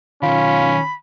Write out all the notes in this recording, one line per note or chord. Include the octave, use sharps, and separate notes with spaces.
B1 D#3 C#4 F4 B5